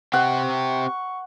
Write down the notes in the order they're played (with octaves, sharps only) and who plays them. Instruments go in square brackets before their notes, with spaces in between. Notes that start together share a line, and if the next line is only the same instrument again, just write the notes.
[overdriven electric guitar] C4 G4 [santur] F#5 [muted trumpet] C#6